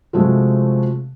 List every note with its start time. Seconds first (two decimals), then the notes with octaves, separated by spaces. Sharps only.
0.13 C3 F3 G#3 A3 C4 F#4